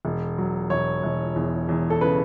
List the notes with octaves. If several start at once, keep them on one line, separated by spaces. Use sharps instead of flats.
E1
F#3
E1 C#5
E1
E2
E2
A4
C#3 B4